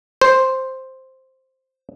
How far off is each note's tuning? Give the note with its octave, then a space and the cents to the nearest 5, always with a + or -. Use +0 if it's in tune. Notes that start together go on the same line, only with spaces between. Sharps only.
C5 +0